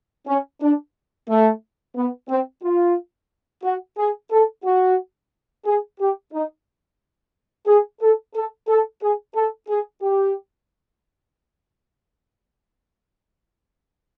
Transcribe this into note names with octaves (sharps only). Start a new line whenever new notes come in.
C#4
D4
A3
B3
C4
F4
F#4
G#4
A4
F#4
G#4
G4
D#4
G#4
A4
A4
A4
G#4
A4
G#4
G4